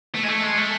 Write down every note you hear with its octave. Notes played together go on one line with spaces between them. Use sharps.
A3
G#3
A3
G#3
A3